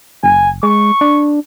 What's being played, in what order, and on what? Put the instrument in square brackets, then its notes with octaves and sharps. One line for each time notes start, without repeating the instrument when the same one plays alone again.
[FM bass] F#1 [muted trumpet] G#5
[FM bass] G#3 [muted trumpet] C#6
[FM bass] D4